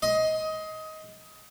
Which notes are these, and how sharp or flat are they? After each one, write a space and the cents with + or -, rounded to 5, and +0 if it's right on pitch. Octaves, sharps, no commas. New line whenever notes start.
D#5 +20 C6 +0